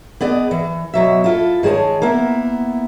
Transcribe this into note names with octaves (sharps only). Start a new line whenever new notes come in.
B3 G#4 D5 D#5
E3
B2 F#3 E5
E4 F4 A4
D#3 G#3 G#4 C#5 A5
A#3 B3 E4